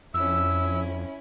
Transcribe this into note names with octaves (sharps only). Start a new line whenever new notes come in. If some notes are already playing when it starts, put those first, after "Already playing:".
F2 C#4 E4 E6